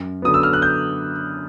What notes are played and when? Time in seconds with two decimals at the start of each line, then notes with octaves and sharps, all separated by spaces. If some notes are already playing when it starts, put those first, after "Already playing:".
Already playing: F#2
0.22 D3 F#3 B3 D#6
0.34 E6
0.43 F6
0.53 F#6
0.62 G6